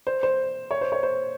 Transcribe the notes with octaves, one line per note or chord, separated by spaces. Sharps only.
C5
C5
C#5
C5
C#5
C5